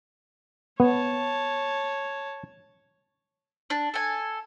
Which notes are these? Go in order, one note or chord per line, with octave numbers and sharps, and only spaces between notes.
B3 C#5 A5
D4
A4 G#5